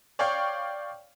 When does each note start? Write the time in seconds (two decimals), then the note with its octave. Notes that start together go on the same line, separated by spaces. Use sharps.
0.19 C#5 D5 F5 G5 C#6